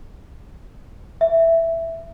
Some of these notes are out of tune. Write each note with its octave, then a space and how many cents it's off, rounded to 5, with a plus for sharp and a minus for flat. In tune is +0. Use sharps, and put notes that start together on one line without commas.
E5 +5